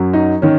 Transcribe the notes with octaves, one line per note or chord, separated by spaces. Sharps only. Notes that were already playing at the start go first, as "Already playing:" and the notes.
Already playing: F#2 F#3
D#4
D#3 C#4